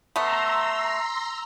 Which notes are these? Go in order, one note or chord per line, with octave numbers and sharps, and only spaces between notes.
A3 B3 A#5 C6 E6